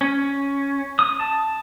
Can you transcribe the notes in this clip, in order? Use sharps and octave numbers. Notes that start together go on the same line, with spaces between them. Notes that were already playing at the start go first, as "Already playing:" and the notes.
C#4
D#6
A5